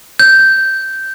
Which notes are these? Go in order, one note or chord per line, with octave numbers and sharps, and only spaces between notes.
G6